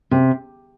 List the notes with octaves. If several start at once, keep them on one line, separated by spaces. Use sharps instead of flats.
C3